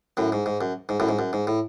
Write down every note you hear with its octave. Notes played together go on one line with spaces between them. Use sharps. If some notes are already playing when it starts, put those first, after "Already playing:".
F#2 A2
G#2
G#2
F#2
G#2
F#2 A2
G#2
F#2
G#2
A2